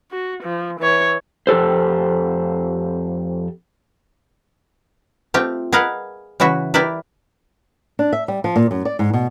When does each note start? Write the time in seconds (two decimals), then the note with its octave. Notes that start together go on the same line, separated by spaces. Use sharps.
0.12 F#4
0.44 F3
0.80 E3 C#5
1.47 F2 G4 A4 C5
5.34 A3 C4 F4 G4
5.72 G#4 A#4 B4 D#5 F5 F#5
6.40 C#3 E3 E4 F#4 E5
6.74 E4 G4 A#4 B4 D5 E5
7.99 D4
8.13 E5
8.28 G3
8.44 F3
8.56 A#2
8.71 F#2
8.85 D5
8.99 G#2
9.13 B2